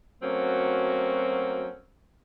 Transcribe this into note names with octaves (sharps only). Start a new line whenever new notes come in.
F#3 A3 A#3 C4 C#4 F#4